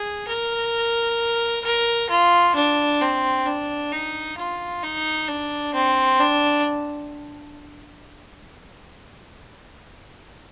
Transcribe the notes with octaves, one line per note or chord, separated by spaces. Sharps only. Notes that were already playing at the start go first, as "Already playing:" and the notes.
Already playing: G#4
A#4
A#4
F4
D4
C4
D4
D#4
F4
D#4
D4
C4
D4